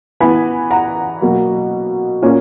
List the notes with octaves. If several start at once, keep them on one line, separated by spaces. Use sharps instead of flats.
E3 B3 G#5 B5
F#5 A#5
B2 F#3 A#3
A#2 A#3 C#4